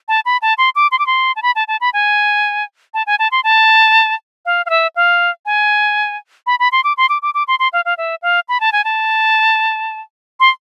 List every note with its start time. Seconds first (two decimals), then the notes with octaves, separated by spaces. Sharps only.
0.08 A5
0.25 B5
0.42 A5
0.58 C6
0.76 D6
0.92 C6
0.99 D6
1.07 C6
1.36 A5
1.43 B5
1.56 A5
1.68 A5
1.81 B5
1.93 G#5
2.94 A5
3.07 G#5
3.19 A5
3.32 C6
3.44 A5
4.46 F5
4.66 F5
4.70 E5
4.96 F5
5.46 G#5
6.47 B5
6.60 B5
6.72 C6
6.84 D6
6.97 C6
7.09 D6
7.22 D6
7.34 D6
7.48 C6
7.59 C6
7.73 F5
7.85 F5
7.98 E5
8.22 F5
8.49 B5
8.60 A5
8.72 G#5
8.84 A5
10.40 C6